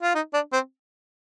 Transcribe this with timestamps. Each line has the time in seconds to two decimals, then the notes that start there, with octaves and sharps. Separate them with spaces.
0.02 F4
0.15 D#4
0.34 D4
0.53 C4